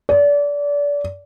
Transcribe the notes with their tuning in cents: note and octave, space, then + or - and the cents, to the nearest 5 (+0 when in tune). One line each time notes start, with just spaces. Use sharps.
D5 -30